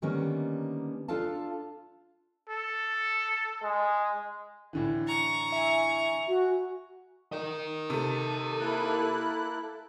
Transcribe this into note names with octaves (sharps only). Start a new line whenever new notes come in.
D3 D#3 G3 A#3 B3 C#4
D4 F4 A4 F5 A5
A4
G#3
A2 D3 E3
A#5 C#6
E5 G#5
F#4
A#4 D#5
C3 A3 A4
A#3 E4 F#6